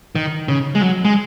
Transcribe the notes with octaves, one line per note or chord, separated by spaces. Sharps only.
D#3
C#3
G#3
F#3
G#3